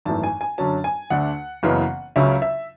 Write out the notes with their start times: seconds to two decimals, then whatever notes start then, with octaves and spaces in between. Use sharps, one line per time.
0.05 G#1 F#2 E3 A3 A5
0.23 G#5
0.41 G#5
0.58 F#2 D3 F#3 C#4 A5
0.84 G#5
1.10 D2 D3 A3 D4 F#5
1.63 F#1 F#2 C#3 E3 B3
2.16 C#2 C#3 F#3 C#4 E5
2.42 E5